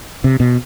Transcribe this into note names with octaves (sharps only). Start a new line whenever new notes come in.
C3
B2